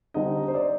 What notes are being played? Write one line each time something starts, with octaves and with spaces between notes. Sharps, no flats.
D3 G3 C4 D#4 D#5
C5
D5